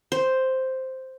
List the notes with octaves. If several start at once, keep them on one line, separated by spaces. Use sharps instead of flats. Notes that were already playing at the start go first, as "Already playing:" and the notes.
C5